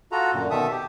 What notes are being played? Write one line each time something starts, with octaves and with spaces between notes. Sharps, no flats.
F4 F#4 A4 A#5
F#2 A#2 D3
B2 D#3 A4 E5 D#6
G4